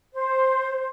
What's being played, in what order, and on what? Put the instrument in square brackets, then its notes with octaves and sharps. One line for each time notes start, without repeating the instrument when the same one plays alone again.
[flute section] C5